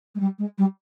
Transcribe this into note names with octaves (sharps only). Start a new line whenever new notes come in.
G#3
G3
G#3
G3